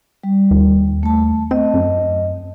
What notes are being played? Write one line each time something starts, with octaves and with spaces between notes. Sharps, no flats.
G3
D#2
A3 A5
C4 D#5
F#2